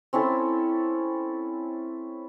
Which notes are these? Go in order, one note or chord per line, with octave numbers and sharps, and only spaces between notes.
C4 C#4 E4 A4